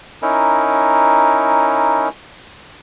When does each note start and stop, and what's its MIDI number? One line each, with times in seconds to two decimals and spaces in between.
0.22 2.09 61
0.22 2.09 63
0.22 2.09 64
0.22 2.09 70